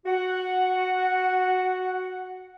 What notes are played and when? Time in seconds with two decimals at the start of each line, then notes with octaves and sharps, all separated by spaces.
0.06 F#4 F#5